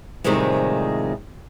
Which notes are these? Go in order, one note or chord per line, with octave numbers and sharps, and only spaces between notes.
A2 C3 D#3 F3 G3 G#3